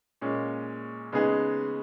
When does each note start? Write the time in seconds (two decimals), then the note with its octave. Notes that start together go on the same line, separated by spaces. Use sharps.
0.21 A#2 G#3 C#4
1.12 C#3 G#3 B3 D#4 G#4